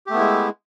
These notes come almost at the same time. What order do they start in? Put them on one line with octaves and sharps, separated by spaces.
G4 A3 B3 E4 G#3